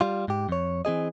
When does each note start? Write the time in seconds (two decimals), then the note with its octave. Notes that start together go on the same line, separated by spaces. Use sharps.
0.01 G3 F4
0.28 G#2 G4
0.49 F2 C#5
0.85 E3 C4 G#4 D#5